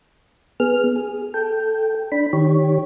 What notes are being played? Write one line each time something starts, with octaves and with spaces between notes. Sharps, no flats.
B3 G#4 F6
G#4
A4 G5
D4 B5
D#3 G4 C#5